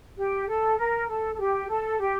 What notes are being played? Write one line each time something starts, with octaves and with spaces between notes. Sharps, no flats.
G4
A4
A#4
A4
A4
G4
A4
G4